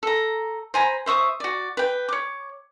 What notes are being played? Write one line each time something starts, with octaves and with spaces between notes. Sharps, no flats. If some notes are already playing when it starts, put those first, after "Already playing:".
A4 A#5
C5 G#5 A#5 B5
C5 E5 C#6 D#6
F#4 D5
B4 G5
C#5 D6